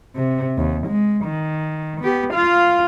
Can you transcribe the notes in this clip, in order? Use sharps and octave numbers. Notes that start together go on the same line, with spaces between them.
C3
D#2
G#3
D#3
B3 G4
F4 F5